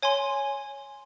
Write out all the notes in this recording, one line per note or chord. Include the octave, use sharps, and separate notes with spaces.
C#5 G#5 C6